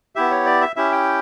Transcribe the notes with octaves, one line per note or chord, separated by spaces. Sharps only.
B3 E4 G4 E5
C#5
D5
E5
C#4 E4 G4 E5
G5